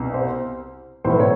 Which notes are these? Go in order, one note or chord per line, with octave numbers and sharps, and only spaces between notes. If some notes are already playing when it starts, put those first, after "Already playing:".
Already playing: C2 B2
C5
B1 A2 E3 C5
C#5